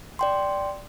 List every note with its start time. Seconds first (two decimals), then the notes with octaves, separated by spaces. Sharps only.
0.19 D5 G5 C6